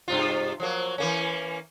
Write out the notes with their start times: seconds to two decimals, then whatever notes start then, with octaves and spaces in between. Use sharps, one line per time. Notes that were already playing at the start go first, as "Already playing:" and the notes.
0.08 G2 C3 F4
0.60 F3 F#3 A#3
0.98 E3 A#3 C#4